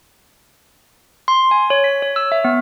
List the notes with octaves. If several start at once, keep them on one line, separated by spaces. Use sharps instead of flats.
C6
G#5
C#5
B6
C#5
E6
E5
B3